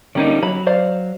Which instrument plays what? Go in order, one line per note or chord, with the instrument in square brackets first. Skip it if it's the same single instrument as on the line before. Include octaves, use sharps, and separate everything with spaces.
[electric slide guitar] D3 C#4 D#4 [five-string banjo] G3 A#3
[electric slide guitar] F#3 [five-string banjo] B5
[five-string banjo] C5 D5 F5